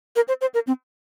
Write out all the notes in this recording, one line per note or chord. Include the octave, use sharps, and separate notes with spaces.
A#4
C5
C5
A#4
C4